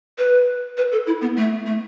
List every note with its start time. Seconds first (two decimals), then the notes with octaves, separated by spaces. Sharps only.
0.18 B4
0.77 B4
0.92 A4
1.07 E4
1.21 B3
1.37 A3
1.66 A3